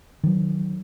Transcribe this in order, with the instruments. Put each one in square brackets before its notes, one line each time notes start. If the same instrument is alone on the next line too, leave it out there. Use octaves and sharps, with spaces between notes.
[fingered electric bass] D#3 F#3